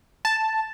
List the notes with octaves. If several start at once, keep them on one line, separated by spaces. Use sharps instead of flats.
A5